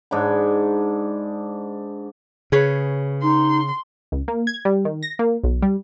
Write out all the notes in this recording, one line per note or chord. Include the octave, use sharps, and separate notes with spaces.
G#2 D4 B5
C#3 G#4 B4 C#5
D#4 C6
C#2
A#3
G#6
G3
D#3
A#6
A#3
B1
G3